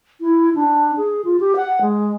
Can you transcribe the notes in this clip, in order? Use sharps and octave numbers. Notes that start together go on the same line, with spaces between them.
E4
D4
G#4
F4
G4
F#5
G#3